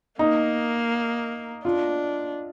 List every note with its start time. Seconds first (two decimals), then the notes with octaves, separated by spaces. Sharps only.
0.19 A#3 D#4
1.65 D4 F4